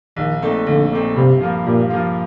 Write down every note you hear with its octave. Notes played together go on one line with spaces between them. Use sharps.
A#1 D#3
A#2 A3 C4 D#4
A#1 D3
A#2 A3 C4 D#4
G2 C3
F3 A#3 F4
G2 A#2
F3 A#3 F4